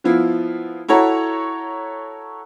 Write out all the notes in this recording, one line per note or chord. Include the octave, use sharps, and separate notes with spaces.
F3 B3 E4 F4
E4 F#4 A4 C#5 A#5